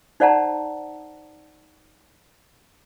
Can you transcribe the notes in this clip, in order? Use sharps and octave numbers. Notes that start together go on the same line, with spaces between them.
D#4 C5 D5 F#5 A5 A#5